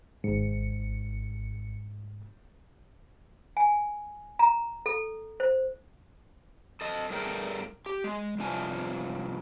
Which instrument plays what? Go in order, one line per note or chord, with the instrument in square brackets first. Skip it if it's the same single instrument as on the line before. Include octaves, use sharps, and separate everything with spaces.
[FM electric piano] G#1 C#7 [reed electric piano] G#2
[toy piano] G#5
A#5
A4
C5
[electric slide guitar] A4 D#5
G2 A3 G#4 A#4 G5
G4
G#3
G2 C3 F3 G#5